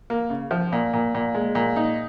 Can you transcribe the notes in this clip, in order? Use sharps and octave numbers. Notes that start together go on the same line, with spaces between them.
A#3
C#3
F3
A#2
A#2
A#2
G#3
A#2
D#4